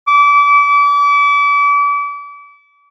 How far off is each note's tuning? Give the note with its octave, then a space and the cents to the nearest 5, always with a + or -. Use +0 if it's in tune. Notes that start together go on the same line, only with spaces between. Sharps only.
D6 -35